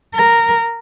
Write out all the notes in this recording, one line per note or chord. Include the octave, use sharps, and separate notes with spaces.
A#4